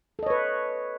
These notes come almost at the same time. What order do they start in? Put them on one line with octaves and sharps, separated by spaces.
A4 D#5 C#5 B4